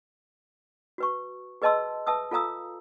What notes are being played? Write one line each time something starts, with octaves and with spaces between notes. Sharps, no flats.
F#4 B4 C#6
G#4 B4 D#5 A5 C6 E6
B4 E5 A5 D#6 E6
F4 A4 F5 A#5 D#6 E6